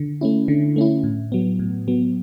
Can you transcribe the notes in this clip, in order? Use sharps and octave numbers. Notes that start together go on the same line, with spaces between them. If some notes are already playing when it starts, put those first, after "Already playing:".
Already playing: D3
A3 C#4 E4
D3
A3 C#4 E4
A2
F#3 B3
A2
F#3 B3